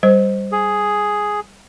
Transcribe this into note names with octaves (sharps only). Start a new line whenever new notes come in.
G3 C5
G#4